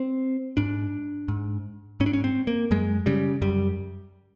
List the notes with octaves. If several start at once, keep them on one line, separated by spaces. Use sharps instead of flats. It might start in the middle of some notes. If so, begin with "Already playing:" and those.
Already playing: C4
G#2 D4
G#2
G#2 C#4
D4
C#4
C4
A#3
F#2 G#3
C#3 G3
F#2 G3